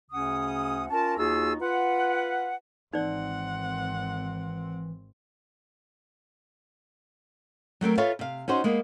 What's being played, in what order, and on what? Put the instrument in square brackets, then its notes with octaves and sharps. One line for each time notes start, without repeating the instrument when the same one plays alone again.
[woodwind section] D2 C#3 C#4 F#5 D#6
C#4 F4 A#4 A5
D#2 D#4 F4 F#4 G#4 E6
F4 B4 F#5
[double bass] G#1 C4 [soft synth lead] E3 [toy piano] D#4 D5 [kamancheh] F#5
[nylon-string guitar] F#3 A3 C4 A#4
F4 A4 B4 C#5 E5 F5
C3 F5
C#4 D#4 F#4 C5
G#3 A#3 B3